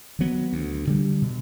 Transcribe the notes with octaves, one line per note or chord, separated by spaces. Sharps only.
D#3 F#3 B3
D2
D3 G3
B2